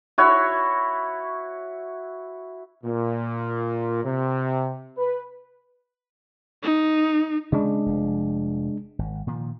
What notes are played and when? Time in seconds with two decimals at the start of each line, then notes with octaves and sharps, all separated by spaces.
0.18 E4 F#4 C#5
2.84 A#2
4.04 C3
4.98 B4
6.63 D#4
7.52 C#3 G#3 C#4 D4
7.86 F1 F3
8.99 G#1
9.27 A#2 D#3 F3